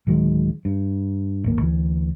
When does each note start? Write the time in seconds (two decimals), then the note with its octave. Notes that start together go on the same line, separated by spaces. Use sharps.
0.07 D1 D#3 F#3 G#3
0.65 G2
1.44 D1 G#1 A#3
1.61 D2 E3